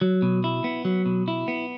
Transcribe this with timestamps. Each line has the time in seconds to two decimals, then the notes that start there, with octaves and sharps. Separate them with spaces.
0.01 F#3
0.22 B2
0.44 E4
0.64 B3
0.85 F#3
1.06 B2
1.28 E4
1.48 B3